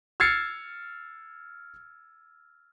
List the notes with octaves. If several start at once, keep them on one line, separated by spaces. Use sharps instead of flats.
E6 F6 G#6 A6 C7 C#7